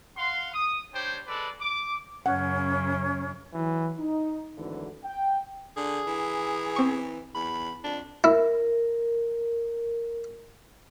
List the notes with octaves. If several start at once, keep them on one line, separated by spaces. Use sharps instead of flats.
F5 F#5 C6
D#6
G3 D4 C5 C#5 G5
G#3 A4 B4 D5
D6
F#2 C#3 C#4 F#5
E3 F#3
D#4
G#1 D2 D3 E3 F#3
G5
D3 G#4
E3
C4 C#6
E2 B5
F2 D4
E4 A#4